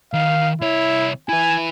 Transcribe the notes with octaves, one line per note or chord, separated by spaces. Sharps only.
D#3 F5
C2 E4 C#5
E4 B4 G#5